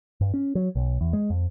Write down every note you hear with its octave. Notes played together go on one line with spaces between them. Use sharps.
G2
C#4
F#3
B1
E2
G#3
F2